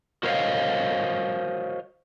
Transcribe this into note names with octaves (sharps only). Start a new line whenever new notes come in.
F#4 A#4 C5 C#5 D#5 F5